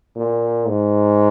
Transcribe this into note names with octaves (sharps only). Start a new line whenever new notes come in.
A#2
G#2